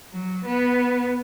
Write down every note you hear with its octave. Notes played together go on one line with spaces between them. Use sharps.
F#3
B3